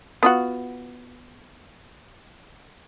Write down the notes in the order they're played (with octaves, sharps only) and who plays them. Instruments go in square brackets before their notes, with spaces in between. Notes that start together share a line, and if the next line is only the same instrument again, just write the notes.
[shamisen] B3 F4 F#4